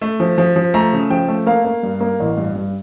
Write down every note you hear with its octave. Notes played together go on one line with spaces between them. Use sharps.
A3
F3
F3
F3
A3 A#5
C#3
F3 G5
A3
A#3 F5
A#3
G2
A#3
A1
G2
G2